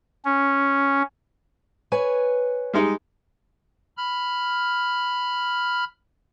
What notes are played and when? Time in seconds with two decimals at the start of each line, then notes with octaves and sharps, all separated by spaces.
0.25 C#4
1.92 B4 C#5 G#5
2.73 G3 G#3 D#4
3.97 B5 F6